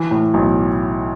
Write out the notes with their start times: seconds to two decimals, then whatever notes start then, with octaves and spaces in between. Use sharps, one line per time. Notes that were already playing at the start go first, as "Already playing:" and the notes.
Already playing: E3
0.11 A2
0.34 B1